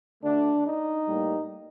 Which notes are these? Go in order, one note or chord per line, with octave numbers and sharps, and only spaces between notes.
D2 D3 A3 D4
D#4
A2 G3 A#3